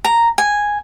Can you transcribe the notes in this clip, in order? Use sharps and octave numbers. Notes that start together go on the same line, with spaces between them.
A#5
G#5